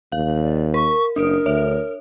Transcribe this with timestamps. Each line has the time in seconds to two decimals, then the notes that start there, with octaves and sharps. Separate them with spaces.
0.12 D#2 F5
0.41 D5
0.74 A#4 C#6
1.16 F#1 D4 A#4 D#6 D7
1.46 D2 C#5 E5